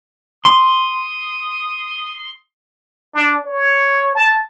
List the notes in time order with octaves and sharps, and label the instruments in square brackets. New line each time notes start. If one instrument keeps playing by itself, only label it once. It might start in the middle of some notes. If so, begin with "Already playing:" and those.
[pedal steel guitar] C6 [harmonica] D#6
[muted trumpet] D4
C#5
A5